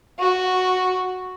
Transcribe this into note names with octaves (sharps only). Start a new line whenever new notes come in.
F#4